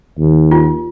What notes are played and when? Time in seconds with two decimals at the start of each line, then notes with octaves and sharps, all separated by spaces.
0.19 D#2
0.51 F4